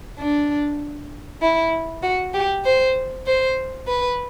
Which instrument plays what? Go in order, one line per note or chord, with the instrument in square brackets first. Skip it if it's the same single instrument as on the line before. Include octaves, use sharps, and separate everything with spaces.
[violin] D4
E4
F#4
G4
C5
C5
B4